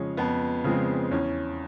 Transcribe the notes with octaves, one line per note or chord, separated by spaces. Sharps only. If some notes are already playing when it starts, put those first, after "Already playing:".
Already playing: F2 C#3 F3 G#3 C#4
F2 B3
C#3 F3 G#3 C4
E2 C#4